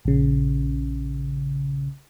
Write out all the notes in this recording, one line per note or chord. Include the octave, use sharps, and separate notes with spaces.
A#1 C#3